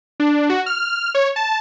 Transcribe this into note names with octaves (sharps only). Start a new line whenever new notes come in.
D4
F#4
F6
C#5
A5